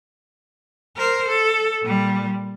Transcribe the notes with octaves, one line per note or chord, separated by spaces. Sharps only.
A#4 C5
A4
A#2 G3